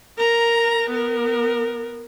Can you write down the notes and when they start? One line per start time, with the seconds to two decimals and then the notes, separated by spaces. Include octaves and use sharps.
0.17 A#4 A#5
0.90 B3 A#4